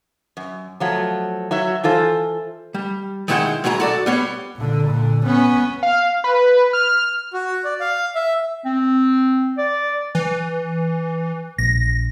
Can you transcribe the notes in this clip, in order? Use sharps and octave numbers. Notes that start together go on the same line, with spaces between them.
F#2
F3 F#3 A3
F#3 F#4 E5
E3 F4 A4 C5
G3
D#3 G#3 E4 A#4 F#5 G5
F#3 G#3 E4 G5 A#5
F#4 A4 D5
G3 B3 C#5
A#2 D3
A#2 D3
B3 C#4
F5
B4
F6
F#4
D5
F5
E5
C4
D5
E3
A#1 A#6